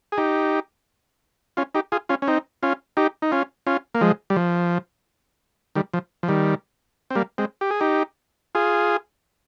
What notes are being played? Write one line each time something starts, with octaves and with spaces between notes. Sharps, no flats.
G#4
D#4 G4
C#4 F4
D#4 G4
F4 G#4
C#4 F4
C#4
C4 D#4
C#4 F4
D#4 G4
D#4
C#4 F4
C#4 F4
A#3
F3 G#3
G3
F3
D#3 G3
F3
F3
D#3 G3
C4
G3 A#3
G#3 C4
G4
G#4
D#4 G4
F4 G#4